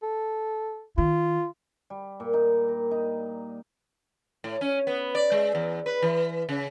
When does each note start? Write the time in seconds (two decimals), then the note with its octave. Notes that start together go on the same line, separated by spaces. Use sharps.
0.03 A4
0.98 D#3 F4
1.90 G3
2.20 A#2
2.33 D#4
2.69 A#4
2.91 D#4
4.44 A2
4.61 C#4
4.87 B3
5.15 D5
5.32 G#3
5.55 E2
5.86 B4
6.02 E3
6.49 C#3